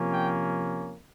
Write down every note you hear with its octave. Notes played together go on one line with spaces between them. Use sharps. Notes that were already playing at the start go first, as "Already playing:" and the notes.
Already playing: C3 F3 A#3 C#4
G5